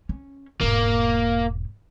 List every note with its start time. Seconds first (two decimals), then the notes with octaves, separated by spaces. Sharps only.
0.09 C#4
0.61 E1 G#2 A#3